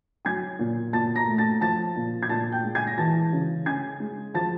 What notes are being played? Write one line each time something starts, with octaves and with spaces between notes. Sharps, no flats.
F#3 G#5 G#6
A#2
A#2 A5 A6
A#5 A#6
A3
A5 A6
F3 A5 A6
A#2
G#6
A#2 A5 A6
G5 G6
G#3
G#5 G#6
A#6
E3 A5 A6
C#3
C#3 G#5 G#6
G#3
F3 A5 A6